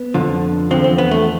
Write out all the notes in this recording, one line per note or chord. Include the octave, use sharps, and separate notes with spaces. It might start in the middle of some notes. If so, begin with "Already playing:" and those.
Already playing: B3
F2 D3 F3
E2 D3 F3 C4
C4
B3
A3